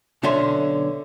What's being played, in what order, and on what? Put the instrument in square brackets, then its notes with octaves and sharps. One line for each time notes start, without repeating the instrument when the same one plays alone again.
[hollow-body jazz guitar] B1 D3 C#4 C#5 E5 C6